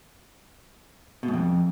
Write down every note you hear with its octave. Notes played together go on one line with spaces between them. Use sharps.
B2
G#2
F2